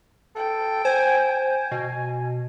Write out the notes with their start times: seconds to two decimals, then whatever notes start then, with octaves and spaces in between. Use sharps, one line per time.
0.36 A4 G5
0.85 C5 G#5
1.29 G#5
1.71 B2